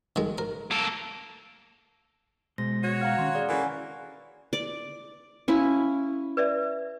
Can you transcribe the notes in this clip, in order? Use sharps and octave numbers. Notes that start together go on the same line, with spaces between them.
D#3 G#3
A#4
A#3 A4
B2 G#3 C5 A#6
F#4 C#5
F5 F#5 A#5 F6
D#3 C#4 C6
G#4 D5
E3 A#3 C#4 F#4 A4 G#5
D5
C#4 E4 F#4 F5
B4 D5 E5